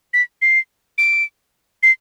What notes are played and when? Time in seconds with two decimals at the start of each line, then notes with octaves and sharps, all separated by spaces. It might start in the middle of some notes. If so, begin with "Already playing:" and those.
0.13 B6
0.42 C7
0.98 D7
1.83 C7